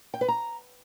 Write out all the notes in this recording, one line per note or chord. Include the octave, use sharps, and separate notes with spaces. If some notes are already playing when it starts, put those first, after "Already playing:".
G5
B4
A#5